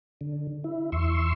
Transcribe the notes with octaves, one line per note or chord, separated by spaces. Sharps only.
D3
E4
E2 C6 C#6 E6